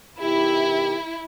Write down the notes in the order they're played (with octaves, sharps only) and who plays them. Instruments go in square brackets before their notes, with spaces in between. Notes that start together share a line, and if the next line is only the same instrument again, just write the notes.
[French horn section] B2 D#3 G4 [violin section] E4